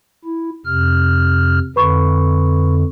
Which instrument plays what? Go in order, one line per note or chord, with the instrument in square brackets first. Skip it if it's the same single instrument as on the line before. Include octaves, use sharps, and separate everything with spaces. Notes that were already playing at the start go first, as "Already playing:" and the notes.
[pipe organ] E4
F2 C3 F6
[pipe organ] F2 D3 [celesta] B4 B5 C#6